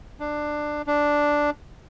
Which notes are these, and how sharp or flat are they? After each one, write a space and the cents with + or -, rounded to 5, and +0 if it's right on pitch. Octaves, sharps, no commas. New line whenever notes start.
D4 +15
D4 +0